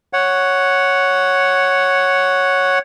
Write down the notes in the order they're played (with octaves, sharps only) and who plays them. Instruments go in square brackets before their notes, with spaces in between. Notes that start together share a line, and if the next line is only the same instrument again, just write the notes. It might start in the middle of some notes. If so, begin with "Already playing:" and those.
[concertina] C#5 F#5